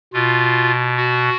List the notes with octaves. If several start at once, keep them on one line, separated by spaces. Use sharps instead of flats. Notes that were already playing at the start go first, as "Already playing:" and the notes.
B2 F4
F#4